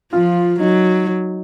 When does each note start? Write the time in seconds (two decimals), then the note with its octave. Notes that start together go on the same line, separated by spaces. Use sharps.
0.13 F3 F4
0.60 F#3 D#4